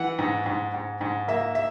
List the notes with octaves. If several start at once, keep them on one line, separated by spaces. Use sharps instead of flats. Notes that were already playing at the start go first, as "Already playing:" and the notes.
Already playing: E3 F#5
G#2
G#2
G#2
G#2
A#3 E5
E5